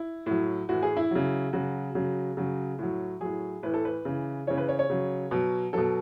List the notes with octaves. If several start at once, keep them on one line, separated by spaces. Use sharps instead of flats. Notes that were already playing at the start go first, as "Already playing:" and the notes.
Already playing: E4
A2 F#3
A2 E3 F#4
G#4
E4
C#3 F#3
C#3 F#3 F#4
C#3 F#3
C#3 F#3
A2 F#3
A2 F#3 G#4
A2 E3 B4
A4
B4
C#3 E3
C#3 E3 C#5
B4
C#5
C#5
C#3 F#3
B2 F#3
B2 F#3 A4